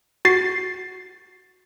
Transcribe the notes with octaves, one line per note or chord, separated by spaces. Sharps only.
F#4 A6 C7